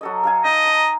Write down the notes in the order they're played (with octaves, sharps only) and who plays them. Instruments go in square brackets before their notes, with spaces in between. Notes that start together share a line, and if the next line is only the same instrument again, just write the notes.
[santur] F#3 A4 D#5
A4 F5 G#5
[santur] D#4 [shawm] D#5
[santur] A#5